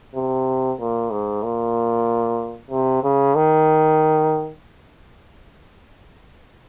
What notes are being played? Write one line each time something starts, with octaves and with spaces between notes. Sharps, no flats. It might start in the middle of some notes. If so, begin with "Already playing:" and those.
C3
A#2
G#2
A#2
C3
C#3
D#3